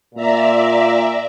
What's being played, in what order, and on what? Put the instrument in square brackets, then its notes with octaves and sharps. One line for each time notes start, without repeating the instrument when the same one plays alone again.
[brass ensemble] A#2 [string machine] D5 E5 A#5